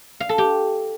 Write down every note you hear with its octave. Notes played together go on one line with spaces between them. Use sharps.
F5
A4
G4